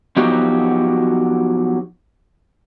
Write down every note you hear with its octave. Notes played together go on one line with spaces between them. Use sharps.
F3 F#3 B3 D#4 F#4 G4